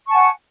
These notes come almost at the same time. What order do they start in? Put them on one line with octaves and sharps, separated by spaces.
C#6 A5 G#5 F#5